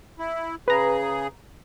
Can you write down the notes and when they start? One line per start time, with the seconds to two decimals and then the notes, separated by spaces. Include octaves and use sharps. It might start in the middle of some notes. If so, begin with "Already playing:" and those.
0.19 E4
0.68 C#3 G#4 B4 A#5